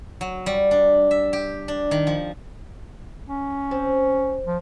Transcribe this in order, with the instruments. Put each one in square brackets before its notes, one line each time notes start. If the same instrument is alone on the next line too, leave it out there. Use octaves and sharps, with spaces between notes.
[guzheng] F#3
G3
D4
E5
G4
D4
D#3
F3
[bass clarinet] C#4
[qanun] C4
[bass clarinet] F3